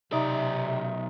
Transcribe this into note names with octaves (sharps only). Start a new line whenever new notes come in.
B1 C3 D#4 D5 E5